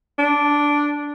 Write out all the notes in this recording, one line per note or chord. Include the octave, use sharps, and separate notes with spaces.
D4